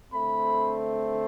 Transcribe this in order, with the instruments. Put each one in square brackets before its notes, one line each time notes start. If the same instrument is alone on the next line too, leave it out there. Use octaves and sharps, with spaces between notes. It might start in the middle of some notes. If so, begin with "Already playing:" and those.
[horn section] D3 A3 C4 B5